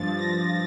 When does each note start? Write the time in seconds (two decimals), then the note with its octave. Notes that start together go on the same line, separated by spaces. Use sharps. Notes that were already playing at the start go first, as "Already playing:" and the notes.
Already playing: G2 F3 A6
0.18 A#6